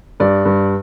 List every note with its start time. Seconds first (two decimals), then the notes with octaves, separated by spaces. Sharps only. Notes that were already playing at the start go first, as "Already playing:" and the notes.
0.20 G2 D5
0.45 G2